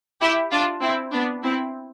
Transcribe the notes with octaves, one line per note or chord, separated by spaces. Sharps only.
E4 G4
D4 F4
C4 E4
B3 D4
C4 E4